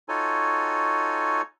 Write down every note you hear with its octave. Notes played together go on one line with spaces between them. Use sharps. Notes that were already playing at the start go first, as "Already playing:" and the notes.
D#4 F4 F#4 A4 C#5 G#5